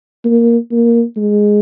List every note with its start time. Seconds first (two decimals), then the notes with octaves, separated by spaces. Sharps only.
0.24 A#3
0.71 A#3
1.17 G#3